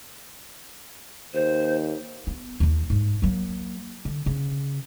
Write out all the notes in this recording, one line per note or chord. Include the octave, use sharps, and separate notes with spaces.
D#2 C5
B3
D#2 E3
G#2
F#3 A#3
D3
C#3